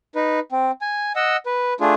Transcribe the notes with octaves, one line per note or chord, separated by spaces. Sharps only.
D#4 B4
C4
G#5
D#5 F#5 E6
B4
A3 D4 F4 G#4